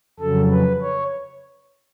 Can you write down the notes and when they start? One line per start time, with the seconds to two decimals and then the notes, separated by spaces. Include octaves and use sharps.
0.20 F2 C#3 F#3 A4
0.51 B4
0.82 C#5